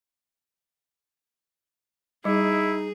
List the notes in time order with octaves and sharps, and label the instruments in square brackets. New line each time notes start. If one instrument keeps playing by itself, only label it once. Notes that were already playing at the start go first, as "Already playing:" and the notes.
[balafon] G3 [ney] D#4 [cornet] E4 [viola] G#4